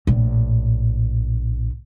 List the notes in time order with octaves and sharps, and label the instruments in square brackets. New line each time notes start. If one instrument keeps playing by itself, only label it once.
[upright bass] A#1 A2